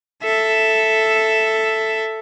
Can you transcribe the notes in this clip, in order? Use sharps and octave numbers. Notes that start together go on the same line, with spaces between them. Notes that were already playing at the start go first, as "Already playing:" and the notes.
A4 E5